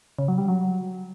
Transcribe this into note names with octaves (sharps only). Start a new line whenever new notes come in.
C#3
F#3
G3
F#3